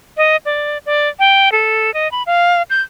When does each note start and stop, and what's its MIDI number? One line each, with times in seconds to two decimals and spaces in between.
0.17 0.36 75
0.46 0.78 74
0.86 1.08 74
1.19 1.52 79
1.52 1.93 69
1.94 2.10 75
2.12 2.23 83
2.26 2.62 77
2.70 2.81 91